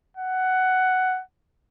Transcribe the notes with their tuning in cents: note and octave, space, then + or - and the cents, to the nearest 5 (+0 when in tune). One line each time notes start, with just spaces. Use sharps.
F#5 +10